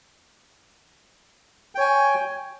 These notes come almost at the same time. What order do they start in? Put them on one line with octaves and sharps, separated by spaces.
G5 C#5 G#5